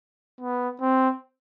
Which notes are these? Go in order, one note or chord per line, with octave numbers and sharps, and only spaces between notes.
B3
C4